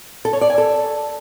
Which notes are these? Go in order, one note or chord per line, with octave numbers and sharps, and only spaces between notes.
A4
C#5
D5
G#5
A4